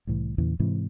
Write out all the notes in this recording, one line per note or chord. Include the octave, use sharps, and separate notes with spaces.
C2 A2 E3
E2 A#2 C#3 E3
G#2 C3 E3